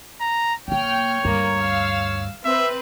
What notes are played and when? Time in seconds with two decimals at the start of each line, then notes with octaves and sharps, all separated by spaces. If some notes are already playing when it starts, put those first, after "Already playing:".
0.20 A#5
0.68 B1 A#3 C#5 G5 F6
1.25 D2 G2 A#3
1.58 F5 E6
2.44 C4 B4 E5